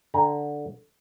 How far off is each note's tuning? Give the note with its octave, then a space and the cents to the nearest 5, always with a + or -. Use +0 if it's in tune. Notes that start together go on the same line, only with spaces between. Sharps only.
D3 +0 G5 +35 A#5 +0